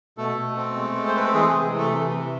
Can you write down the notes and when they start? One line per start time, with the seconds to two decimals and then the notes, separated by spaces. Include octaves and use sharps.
0.18 B2 A3 A4
0.37 B2
0.56 C4
0.76 G#3
0.96 G#3
1.08 C5
1.15 C4 B4
1.25 A4
1.34 E3 G#3 G#4
1.49 C3 G#3 G#4
1.73 E3 A3 A4
1.92 C3
2.11 C3